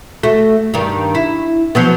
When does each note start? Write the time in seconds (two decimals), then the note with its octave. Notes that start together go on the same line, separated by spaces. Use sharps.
0.23 A3 F#4
0.74 G2 D#3
1.15 E4
1.75 F3 F#3 B3